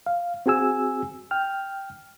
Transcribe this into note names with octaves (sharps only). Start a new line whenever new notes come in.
F5
C4 F#4 G#4 G#5 E6
G5 F6